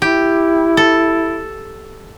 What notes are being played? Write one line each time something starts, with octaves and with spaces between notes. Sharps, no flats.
E4 G4
A4